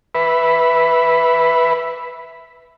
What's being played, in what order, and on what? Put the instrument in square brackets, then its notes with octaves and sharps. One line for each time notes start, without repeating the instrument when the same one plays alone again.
[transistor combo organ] B4 E5 B5